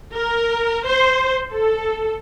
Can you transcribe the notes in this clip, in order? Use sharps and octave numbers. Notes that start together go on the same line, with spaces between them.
A#4
C5
A4